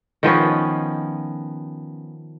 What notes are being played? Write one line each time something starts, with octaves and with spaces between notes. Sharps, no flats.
D#3 F3 B3 C#4